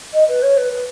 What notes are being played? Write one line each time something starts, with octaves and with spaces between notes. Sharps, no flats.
D#5
B4
C#5
B4
B4